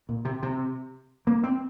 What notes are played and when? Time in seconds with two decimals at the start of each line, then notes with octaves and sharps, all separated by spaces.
0.09 A#2
0.25 C3
0.43 C3
1.27 A#3
1.44 C4